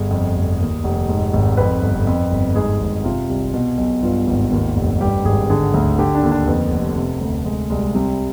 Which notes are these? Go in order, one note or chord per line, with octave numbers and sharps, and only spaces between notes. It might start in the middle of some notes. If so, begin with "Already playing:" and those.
Already playing: G1 G#4
F2
F1
D#2
F1
G#2
G#1
F2 B4
G1
F2
G1
G#2 G#4
G#1
C3 F4
C2
B2
B1
G2 F4
G#1
D#2
F1
G2 G4
G#1 G#4
D3 G#4
D2
D3 G4
D4
D#2
D4
F2 B3
F1
C3
D2
C3 G#3
C2 G#3
G#3
C3 G3